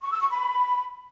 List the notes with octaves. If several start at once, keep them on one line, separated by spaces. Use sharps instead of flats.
C#6
E6
C#6
B5